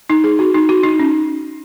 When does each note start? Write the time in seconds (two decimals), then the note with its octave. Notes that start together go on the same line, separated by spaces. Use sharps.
0.10 D#4
0.24 G#4
0.39 F#4
0.54 D#4
0.69 F#4
0.83 D#4
0.99 C#4